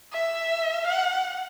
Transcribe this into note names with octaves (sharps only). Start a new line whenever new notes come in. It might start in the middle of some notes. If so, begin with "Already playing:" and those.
E5
F#5